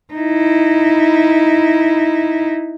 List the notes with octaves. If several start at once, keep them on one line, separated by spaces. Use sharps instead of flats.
D#4 E4